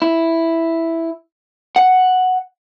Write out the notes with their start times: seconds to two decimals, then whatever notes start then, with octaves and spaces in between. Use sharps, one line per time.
0.02 E4
1.76 F#5